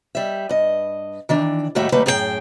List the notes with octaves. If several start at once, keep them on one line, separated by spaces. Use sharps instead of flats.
G3 E5
G2 D#5
D#3 E3 D4
D#2 A2 G3 A3 F#4 E5
D#2 G3 A3 A#3 B4
F#2 A2 G#4 A4 G5